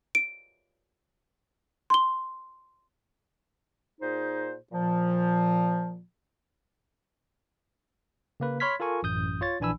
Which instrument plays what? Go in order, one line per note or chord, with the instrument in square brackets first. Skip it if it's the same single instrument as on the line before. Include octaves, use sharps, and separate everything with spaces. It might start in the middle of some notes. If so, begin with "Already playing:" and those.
[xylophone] D7
C6 G7
[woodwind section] A#2 D#4 G#4 C5
A#2 F3
[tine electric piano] C#3 A#3 B4
C#5 B5 C6 F6 G#6 B6
F4 A4 A#4 G#5 C#6
A1 F#2 D#6 G6
F4 C#5 A6
A#1 E3 D4 G#5 B5 E6